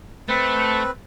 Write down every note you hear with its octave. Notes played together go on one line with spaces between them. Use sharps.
A3 C4 B4